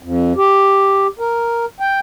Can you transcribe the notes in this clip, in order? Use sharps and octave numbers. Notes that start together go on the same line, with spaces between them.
F2
G4
A#4
G5